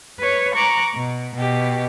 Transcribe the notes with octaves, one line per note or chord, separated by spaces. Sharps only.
B4 C#5
A#5 C#6 D6 F#6
B2
B2 G4